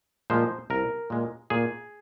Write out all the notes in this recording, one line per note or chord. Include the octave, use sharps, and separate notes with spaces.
A#2 F3 G#3 C5
C2 A#4
A#2 G#3
A#2 G#4